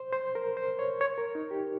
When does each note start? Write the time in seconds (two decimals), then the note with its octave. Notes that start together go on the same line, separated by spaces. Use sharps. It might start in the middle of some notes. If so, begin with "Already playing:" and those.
Already playing: C5
0.13 C5
0.35 A#4
0.57 C5
0.79 C#5
1.01 C#5
1.18 A#4
1.35 D#4
1.51 G4